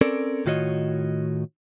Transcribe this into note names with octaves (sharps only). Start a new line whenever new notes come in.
C4 C#4 A4 A#4 D5
A2 D#3 F4 F#4 C#5 D#5